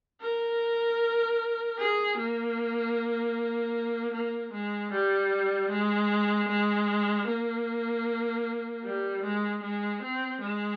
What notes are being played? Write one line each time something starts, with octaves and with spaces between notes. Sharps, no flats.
A#4
G#4
A#3
A#3
G#3
G3
G#3
G#3
A#3
G3
G#3
G#3
C4
G#3